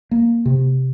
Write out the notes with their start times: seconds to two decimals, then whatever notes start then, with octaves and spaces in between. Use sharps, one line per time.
0.11 A#3
0.46 C3